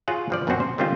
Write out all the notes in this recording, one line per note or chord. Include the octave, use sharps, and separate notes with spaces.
F4 F#4 G#4 C#5 F#5
G2 F3 D5
A#1 F#2 B2 F#3 C4 F#4
C5
D3 D#3 G3 C4 C#4 F4